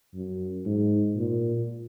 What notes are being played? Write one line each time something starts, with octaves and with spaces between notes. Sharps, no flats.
F#2
G#2
A#2